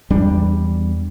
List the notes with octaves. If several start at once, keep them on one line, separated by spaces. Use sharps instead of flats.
E2 G3 D4